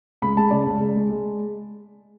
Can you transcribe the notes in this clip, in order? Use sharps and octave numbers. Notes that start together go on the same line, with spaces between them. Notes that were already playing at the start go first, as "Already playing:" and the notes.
C#2 B5
G#3 A5
C#3 D5
C#2
C#2
G#3
G#3